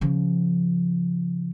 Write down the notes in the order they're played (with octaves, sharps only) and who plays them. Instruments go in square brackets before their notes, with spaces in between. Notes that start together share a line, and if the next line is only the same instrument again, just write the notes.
[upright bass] C#3 F3